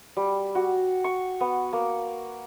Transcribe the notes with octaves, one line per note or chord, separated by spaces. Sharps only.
G3
F#4
C#6
B3
A#3